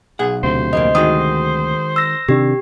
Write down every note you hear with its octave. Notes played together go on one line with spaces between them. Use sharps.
B1 G#4 F#5
D2 C3 C5
F2 A#2 A#3 D#5
D#3 G#3 F#4 D#6
E6 A#6
C3 D#3 D4 G4